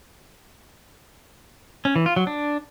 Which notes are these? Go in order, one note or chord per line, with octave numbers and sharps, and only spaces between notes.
C#4
E3
F4
F#3
D4